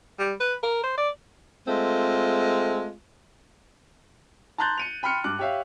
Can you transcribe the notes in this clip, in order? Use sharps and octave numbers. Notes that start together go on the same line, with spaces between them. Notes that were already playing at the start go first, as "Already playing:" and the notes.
G3
B4
A#4
C5
D5
G#3 A3 C4 F4
A5 A#5 C6 F#6 G6 A6
C#7 D#7 F7
G5 B5 C6 F6 C#7
G2 D6 F#6
G4 C#5 E5 F5